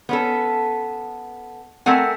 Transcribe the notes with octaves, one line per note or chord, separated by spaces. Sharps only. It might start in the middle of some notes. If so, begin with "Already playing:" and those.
B3 C#4 A4
A3 C4 A#4 F#5 G#5